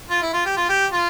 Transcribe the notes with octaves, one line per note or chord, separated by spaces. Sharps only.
F4
E4
F4
G4
F4
G4
F4